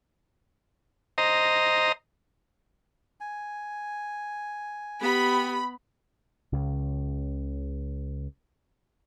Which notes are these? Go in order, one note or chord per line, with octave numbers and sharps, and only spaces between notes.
C5 D#5 A#5
G#5
B3 G4 B5
C#2 C#3